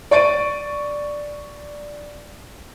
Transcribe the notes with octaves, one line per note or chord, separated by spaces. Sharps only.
D5 C#6 A6 D7 D#7